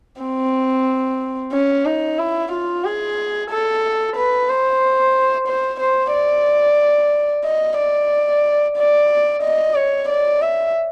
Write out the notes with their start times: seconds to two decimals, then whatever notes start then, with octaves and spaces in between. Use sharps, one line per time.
0.21 C4
1.53 C#4
1.86 D#4
2.19 E4
2.52 F4
2.85 G#4
3.50 A4
4.16 B4
4.49 C5
5.48 C5
5.81 C5
6.13 D5
7.45 D#5
7.78 D5
8.77 D5
9.43 D#5
9.75 C#5
10.09 D5
10.42 E5